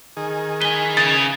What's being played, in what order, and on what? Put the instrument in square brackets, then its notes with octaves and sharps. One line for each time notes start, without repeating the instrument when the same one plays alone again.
[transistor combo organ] D#3 G#4
[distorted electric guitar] B4 G#5 [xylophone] G7
[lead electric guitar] C#3 [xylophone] A6